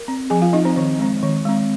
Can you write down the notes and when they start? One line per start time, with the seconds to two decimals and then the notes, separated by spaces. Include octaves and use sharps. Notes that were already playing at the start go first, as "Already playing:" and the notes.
Already playing: A#4
0.08 C4
0.30 F3 G#4 G#5
0.42 F4 F5
0.53 C4 D#4 D#5
0.65 C4 C5
0.76 D#3 C4 C5
0.99 G#3 C4
1.23 D#3
1.45 G#3 C4